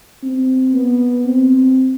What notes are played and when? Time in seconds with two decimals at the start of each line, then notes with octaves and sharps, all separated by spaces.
0.23 C4
0.73 B3
1.25 C4